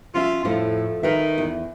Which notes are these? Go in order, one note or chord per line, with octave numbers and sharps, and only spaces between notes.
F3 C#4 F4 E5
F2 A2 F3 A3
D#3 A#4 B4 E5
E2